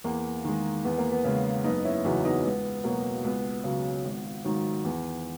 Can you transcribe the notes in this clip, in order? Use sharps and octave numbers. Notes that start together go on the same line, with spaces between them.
E2 A#3
D#3 G#3
E2 B3
A#3
B3
C#3 G#3
F#1 B3 D#4
C#4 E4
E2 C#3 F#3 B3 D#4
B3 D#4
C#2 B3
B2 F#3 A#3
C#2 B3
C#3 F#3
G#1
G#2 D#3 F#3
E2